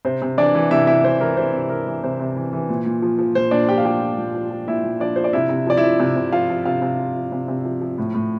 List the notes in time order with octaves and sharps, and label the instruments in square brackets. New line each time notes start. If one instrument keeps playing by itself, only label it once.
[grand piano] C3 C5
C3
E3 D4 D5
E3
C3 E4 E5
C3 E4 E5
E3 C5
E3 A#4
C3 C5
C3
E3 A#4
E3
C3 C5
C3
E3
E3
A#2
A#2
F3
F3
A#2 C5
A#2 D4 D5
F3 G4 G5
F5
F3 G4 G5
A#2
A#2
F3
F3
A#2 E4 E5
A#2
F3 D4 D5
F3 C5
D5
C3 E4 E5
C3
F3 D5
E4 E5
F3
C3
C3
F3 F4 F5
F3
C3 F4 F5
C3
F3
F3
C3
C3
F3
F3
A2
A2